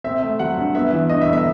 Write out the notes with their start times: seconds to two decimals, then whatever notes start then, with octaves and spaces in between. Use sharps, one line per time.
0.04 C4 E5
0.22 A3
0.39 F#3 F#5
0.57 G2
0.75 B3 E5
0.92 E3
1.09 G2 D#5
1.21 E5
1.27 G1
1.33 E5